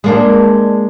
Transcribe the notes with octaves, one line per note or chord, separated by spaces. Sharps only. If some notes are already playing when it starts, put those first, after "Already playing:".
G#3 A#3 D4